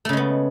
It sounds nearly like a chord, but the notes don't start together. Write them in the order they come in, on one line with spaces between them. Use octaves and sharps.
A3 C#3 G#3 B3